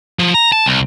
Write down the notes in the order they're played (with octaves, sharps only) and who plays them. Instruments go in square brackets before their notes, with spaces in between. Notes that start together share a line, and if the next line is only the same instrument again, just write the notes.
[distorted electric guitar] F3
A#5
A5
C2